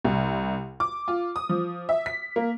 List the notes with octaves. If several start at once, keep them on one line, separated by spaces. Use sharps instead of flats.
C2
D6
F4
D#6
F3
E5
B6
A#3